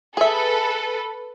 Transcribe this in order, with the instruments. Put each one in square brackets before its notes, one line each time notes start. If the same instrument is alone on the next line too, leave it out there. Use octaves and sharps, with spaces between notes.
[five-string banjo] G#4 E5 [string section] A4 B4